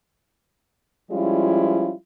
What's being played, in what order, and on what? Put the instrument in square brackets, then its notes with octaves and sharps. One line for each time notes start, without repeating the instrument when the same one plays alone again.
[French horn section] F3 G3 G#3 C#4 E4 F4